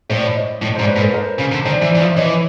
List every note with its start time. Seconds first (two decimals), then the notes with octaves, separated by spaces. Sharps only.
0.09 A2 C5 D5
0.35 C#5 D#5
0.62 A2
0.74 C5 D5
0.79 G#2
0.87 B4 C#5
0.96 G#2 A#4
1.00 A4 B4
1.13 A#4 C5
1.39 C#3
1.52 D3
1.65 D#3 C5 D5
1.82 E3 D5 E5
1.95 E3
1.99 F3 D5 E5
2.17 E3 C#5 D#5